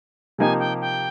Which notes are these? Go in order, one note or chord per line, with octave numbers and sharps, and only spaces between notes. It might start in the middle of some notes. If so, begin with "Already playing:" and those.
C3 F3 A#3 D#4 G4 G#5
G5
G5